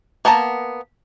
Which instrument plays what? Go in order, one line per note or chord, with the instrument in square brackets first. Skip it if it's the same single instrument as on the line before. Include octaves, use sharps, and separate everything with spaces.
[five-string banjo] A#3 B3 A#4 A5 A#5